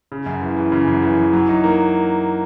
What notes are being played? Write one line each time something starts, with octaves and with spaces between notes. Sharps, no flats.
C#3
F#2
E3
E3
C#3
F#2
E3
E3
F#3
D#4
A#3